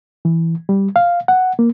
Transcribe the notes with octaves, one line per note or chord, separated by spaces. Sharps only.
E3
G3
F5
F#5
A#3